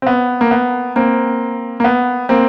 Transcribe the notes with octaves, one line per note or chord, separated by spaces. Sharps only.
C4
B3
A#3
B3
A#3 C4
A#3
B3
A#3 C4